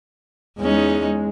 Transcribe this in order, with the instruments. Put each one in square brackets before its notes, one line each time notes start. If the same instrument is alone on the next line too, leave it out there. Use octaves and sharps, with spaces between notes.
[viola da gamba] E2 C#4 D#4 [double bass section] G#3